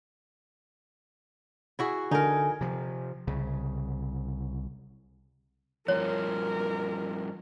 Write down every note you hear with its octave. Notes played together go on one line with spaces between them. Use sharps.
E4 F#4 G#4
D3 D#4 A4 A#4 G#5
C3 F3
C2 C#3
G2 F3 A#4 C#5